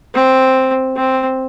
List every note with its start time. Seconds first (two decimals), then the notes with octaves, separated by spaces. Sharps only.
0.15 C4
0.96 C4